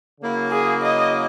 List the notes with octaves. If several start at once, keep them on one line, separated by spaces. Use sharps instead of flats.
C#3 F#3 A#3 E4
G#4
D#5